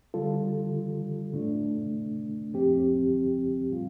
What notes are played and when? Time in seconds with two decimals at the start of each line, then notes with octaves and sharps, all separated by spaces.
0.14 D3 G3 F4 A4
1.33 A2 A3 D4
2.51 F2 F3 C4 G4
3.70 A2 G3 F4